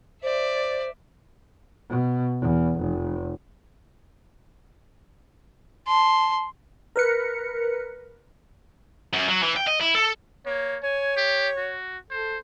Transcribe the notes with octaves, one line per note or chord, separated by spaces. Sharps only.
C5 D5 E5
B2
E2
F1
A5 C6
A#4 B4 C#7
F#2
F#3
E3
G5
D#5
E4
A4
A#3 C#5
C#5 G#5
G4
F#4
A4 C5